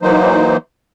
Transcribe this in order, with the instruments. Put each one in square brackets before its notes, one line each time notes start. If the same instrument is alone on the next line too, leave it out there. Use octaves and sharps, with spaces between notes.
[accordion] E3 F#3 A#3 D#4 C5